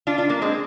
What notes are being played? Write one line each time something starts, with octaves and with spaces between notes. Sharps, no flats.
D4 F4
D4 F4
A#3 D4
G#3 C4